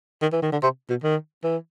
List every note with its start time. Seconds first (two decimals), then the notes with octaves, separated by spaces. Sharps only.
0.22 D#3
0.32 E3
0.42 D#3
0.52 D3
0.63 C3
0.90 B2
1.03 D#3
1.44 E3